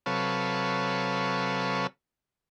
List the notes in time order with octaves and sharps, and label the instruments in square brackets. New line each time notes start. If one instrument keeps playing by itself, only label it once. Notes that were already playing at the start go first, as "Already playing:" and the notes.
[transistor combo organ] C3 F#3 A4 B4 C#5 F5